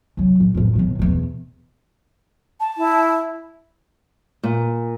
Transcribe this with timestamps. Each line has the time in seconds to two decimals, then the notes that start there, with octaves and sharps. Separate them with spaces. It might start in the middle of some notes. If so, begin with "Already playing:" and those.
0.17 C3 F#3
0.40 A2
0.54 F2 A2
0.75 D#2 B2
0.99 E2 B2
2.60 A5
2.77 E4
4.43 A#2